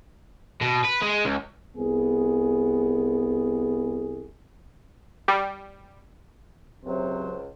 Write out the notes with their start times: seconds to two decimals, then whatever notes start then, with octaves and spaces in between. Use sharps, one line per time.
0.61 B2
0.84 B4
1.02 G#3
1.25 C#2
1.77 C2 B3 G#4
5.28 G3
6.85 C#2 C3 F#3 C5